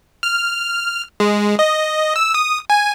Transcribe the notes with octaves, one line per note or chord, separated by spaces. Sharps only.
F6
G#3
D#5
E6
D#6
G#5